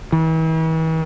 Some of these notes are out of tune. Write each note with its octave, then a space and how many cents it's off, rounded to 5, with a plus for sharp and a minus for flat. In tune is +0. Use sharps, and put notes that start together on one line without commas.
E3 -40